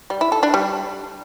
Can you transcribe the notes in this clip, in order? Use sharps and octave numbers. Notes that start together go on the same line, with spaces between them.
G3
E4
A4
D4
G3